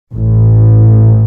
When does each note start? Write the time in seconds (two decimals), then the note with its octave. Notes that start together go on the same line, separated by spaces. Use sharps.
0.13 A1 A2